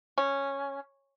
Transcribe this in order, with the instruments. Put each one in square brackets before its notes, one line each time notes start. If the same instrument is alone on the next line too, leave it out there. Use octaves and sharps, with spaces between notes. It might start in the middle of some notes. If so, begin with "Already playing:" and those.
[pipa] C#4